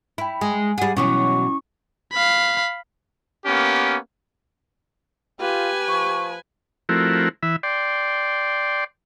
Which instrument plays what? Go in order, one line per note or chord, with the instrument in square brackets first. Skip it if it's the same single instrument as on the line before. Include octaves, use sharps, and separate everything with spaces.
[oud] E4 [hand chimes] G5 B5
[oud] G#3 [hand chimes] G#5
[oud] G3 G#4 [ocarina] F#5
[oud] B2 E3 F#3 [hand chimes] C#4 E4 D6 [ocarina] C#6
[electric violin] F5 B5
[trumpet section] A#3 B3 C#4 G4
[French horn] F4 [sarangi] G4 [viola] B4 G#5
[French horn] F3 [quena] C#6
[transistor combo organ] F3 A3 C4 E4 F#4 A#4
E3 E5 B5
D5 G5 C6